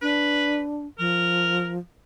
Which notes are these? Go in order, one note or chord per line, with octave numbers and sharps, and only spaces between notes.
D4 B4
F3 A#4